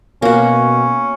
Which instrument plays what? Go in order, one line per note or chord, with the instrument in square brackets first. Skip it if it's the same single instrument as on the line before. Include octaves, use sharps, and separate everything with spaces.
[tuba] B2 [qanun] A#3 F#4 [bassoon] C#4